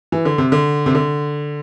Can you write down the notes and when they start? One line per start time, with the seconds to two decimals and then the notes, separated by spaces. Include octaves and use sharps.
0.12 E3
0.25 D3
0.38 C3
0.52 D3
0.86 C3
0.95 D3